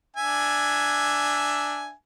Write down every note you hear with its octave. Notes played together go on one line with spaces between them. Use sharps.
D4 E5 G#5